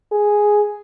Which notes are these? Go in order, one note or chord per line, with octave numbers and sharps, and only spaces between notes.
G#4